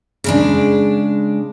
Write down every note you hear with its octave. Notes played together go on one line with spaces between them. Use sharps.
C#3 G#3 D4